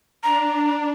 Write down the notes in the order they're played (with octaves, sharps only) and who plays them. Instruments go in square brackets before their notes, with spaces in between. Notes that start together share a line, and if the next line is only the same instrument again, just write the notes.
[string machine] D4 [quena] A#5